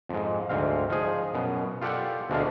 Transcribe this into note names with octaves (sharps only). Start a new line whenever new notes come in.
F2 G#2
D2 G#2 C4 F5
F3 D#4 G#4
F#2 B2
F4 G4 A4 D5 F#5 G5
D2 B2 G#3 D4 A4 F5